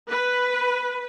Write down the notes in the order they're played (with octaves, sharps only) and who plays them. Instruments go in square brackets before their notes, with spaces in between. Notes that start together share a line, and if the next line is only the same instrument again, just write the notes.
[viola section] B4